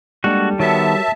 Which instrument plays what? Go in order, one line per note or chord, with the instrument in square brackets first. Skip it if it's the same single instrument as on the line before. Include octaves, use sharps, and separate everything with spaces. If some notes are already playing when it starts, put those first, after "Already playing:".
[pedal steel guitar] G3 A4 [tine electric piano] G#3 A#3 D4 [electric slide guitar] F#4
[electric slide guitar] D#3 B3 [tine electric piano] F#4 A#4 C#5 [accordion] E5 A5